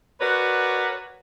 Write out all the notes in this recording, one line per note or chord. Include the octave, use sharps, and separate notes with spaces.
F#4 A#4 B4 C#5 D5